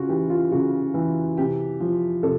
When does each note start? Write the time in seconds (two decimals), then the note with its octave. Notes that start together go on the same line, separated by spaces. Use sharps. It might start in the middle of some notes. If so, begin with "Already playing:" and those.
Already playing: C#3 F4 F#4
0.09 E3 G4
0.30 F4
0.52 C#3 F#4
0.94 E3
1.37 C3 G4
1.80 F3
2.23 C3 A4